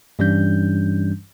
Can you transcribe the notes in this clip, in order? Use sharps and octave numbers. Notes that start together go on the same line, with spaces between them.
G2 E3 G3 C#4 D4 G6